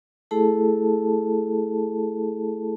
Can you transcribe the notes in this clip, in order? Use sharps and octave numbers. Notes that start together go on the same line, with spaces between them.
A3 E4 G#4 A4 A5